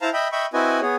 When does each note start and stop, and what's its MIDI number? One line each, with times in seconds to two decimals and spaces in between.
0.01 0.10 64
0.01 0.10 72
0.01 0.10 77
0.01 0.10 81
0.01 0.10 82
0.13 0.28 75
0.13 0.28 76
0.13 0.28 79
0.13 0.28 83
0.32 0.46 75
0.32 0.46 76
0.32 0.46 79
0.32 0.46 83
0.32 0.46 85
0.54 0.80 60
0.54 0.80 64
0.54 0.80 66
0.54 0.80 71
0.54 0.80 75
0.54 0.80 80
0.81 0.96 59
0.81 0.96 68
0.81 0.96 73